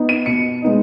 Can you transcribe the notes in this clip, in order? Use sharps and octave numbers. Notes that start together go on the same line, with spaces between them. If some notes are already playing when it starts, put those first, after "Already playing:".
Already playing: B3 D#4
D#7
B2 C#7
G#3 B3 D#4